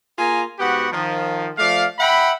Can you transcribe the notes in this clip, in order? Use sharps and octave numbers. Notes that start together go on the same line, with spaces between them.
A#3 F4 G#4 G#5 A#5
G#2 B3 F#4 G4 F#5
D#3 F3
F3 A3 D5 F5
E5 F#5 G5 B5